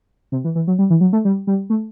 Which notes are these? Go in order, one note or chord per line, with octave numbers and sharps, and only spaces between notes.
C3
E3
E3
F#3
G3
E3
F#3
A3
G3
G3
A3